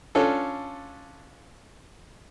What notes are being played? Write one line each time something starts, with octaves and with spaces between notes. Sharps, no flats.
C#4 D4 F4 A4